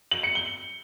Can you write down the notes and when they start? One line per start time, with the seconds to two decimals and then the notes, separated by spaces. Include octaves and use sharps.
0.11 F#7
0.23 C#7
0.35 G7